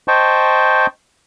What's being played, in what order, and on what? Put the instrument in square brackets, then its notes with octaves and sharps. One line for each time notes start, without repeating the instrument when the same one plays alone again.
[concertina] C5 D#5 G5 A5 C#6